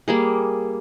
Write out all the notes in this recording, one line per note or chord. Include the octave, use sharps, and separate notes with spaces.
G3 A#3 G#4